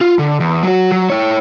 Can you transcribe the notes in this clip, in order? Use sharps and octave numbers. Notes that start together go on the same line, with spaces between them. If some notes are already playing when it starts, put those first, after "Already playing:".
F4
D3
E2
F#3 F#4
F#3
E4 C#5